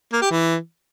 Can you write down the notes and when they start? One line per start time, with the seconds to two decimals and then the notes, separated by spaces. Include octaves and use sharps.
0.13 A#3
0.22 G4
0.30 E3